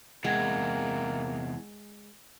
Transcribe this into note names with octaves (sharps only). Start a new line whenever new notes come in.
E2 C3 G#3 A#3 F#5 G#6